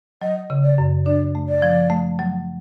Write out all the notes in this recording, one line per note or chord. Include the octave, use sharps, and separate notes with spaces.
F#3 D#5
C#3
D5
F#2
D4 D5
A3
D5
F3
A3
F#3